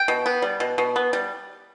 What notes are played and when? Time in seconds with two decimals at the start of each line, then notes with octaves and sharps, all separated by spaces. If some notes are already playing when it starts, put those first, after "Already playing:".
Already playing: G5
0.08 B2
0.26 B3
0.42 G3
0.60 B2
0.78 B2
0.96 B3
1.13 G3